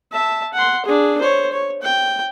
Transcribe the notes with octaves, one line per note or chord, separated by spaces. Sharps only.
E5 A5
F#5 C6
D4 G#4
C5 C#5
C#5
G5